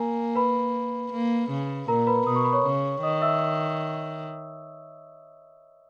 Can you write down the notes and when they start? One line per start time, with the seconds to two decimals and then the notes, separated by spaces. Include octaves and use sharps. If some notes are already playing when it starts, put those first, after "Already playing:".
Already playing: A#3 A#4 G#5 A#5
0.35 B4 B5
1.12 A#3
1.50 C#3
1.88 A#2 A#4 A#5
2.07 B4 B5
2.27 B2 D#6
2.36 C#6
2.44 B5
2.52 C#5 C#6
2.65 C#3
3.03 D#3 D#5 D#6
3.22 E5 E6